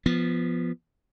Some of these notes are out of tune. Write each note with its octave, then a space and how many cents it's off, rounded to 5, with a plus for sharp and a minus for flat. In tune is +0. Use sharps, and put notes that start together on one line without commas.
F3 -10 B3 +0